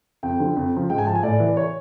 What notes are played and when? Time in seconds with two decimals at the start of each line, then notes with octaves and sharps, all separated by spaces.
0.23 F2 G5
0.39 D3 F3
0.56 F2
0.73 C#3 F3
0.90 G#2 G5
0.98 G#5
1.07 F3 A5
1.15 G#5
1.23 A2 D5
1.40 E3
1.57 C#5